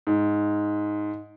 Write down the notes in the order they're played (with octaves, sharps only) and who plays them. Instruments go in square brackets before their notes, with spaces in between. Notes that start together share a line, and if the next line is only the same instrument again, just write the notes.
[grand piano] G#2